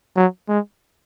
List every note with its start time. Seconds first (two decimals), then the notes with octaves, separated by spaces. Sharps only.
0.16 F#3
0.49 G#3